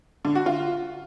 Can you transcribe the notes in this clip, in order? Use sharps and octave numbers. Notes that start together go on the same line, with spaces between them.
D3
F#4
F4